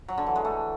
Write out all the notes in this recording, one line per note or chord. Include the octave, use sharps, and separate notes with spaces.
F#3
D3
E3
G#3
A3